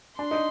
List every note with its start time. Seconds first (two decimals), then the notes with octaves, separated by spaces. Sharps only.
0.19 D4 C6
0.31 D#4